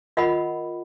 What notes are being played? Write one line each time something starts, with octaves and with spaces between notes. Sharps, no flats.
F4 A#4 D#5 F#5 B5